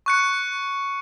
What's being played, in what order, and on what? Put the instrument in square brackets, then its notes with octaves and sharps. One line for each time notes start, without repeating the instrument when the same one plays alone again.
[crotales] C#6 F#6 C#7